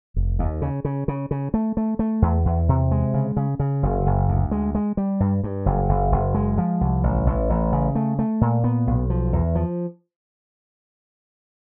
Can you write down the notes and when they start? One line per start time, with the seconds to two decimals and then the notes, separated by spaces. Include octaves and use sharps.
0.16 F1
0.39 D#2
0.62 C#3
0.85 C#3
1.08 C#3
1.31 C#3
1.54 A3
1.77 A3
1.99 A3
2.22 E2
2.45 E2
2.69 C3
2.91 G#3
3.14 C#3
3.37 C#3
3.59 C#3
3.83 F#1
4.06 F#1
4.29 D2
4.51 G#3
4.75 G#3
4.97 G3
5.20 G2
5.44 G2
5.66 F#1
5.89 F#1
6.12 F#1
6.34 G#3
6.58 F3
6.81 C2
7.03 A1
7.27 A1
7.50 A1
7.73 C#3
7.95 A3
8.19 A3
8.41 A#2
8.64 B3
8.87 B1
9.10 F3
9.33 E2
9.55 F3